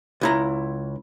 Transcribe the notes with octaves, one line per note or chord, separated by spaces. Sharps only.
C#2 E4 A#5